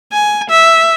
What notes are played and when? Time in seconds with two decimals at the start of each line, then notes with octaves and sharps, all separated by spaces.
0.12 G#5
0.50 E5